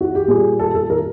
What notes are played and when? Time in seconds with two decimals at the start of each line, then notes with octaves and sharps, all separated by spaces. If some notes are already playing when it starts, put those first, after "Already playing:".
0.01 F#4
0.15 G4
0.28 A#2 G3 G#4
0.59 A4
0.75 A4
0.90 A#4